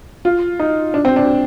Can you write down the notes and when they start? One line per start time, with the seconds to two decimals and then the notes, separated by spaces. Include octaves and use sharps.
0.25 F4
0.59 D#4
0.94 D4
1.05 C4
1.16 D4